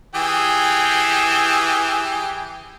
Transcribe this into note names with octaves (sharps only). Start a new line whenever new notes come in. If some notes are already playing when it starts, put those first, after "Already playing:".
E3 G4 G#4